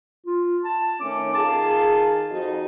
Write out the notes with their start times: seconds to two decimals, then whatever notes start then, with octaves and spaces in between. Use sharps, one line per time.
0.26 F4
0.65 A5
1.00 D#3 A3 C#4 D6
1.35 D#3 F4 G#4 A5
2.30 F2 D#4 F#4